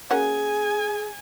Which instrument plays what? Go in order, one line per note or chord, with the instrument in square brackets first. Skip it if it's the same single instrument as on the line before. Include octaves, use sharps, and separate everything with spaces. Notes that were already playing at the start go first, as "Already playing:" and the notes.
[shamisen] A#3 C#4 F#4 [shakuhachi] G#4 [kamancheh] G#5